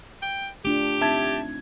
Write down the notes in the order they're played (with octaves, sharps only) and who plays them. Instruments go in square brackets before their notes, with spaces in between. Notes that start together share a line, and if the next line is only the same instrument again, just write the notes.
[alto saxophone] G5
[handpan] A3 D4 F4 [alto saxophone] G4
[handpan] C4 D#4 [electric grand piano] E5 A5 G#6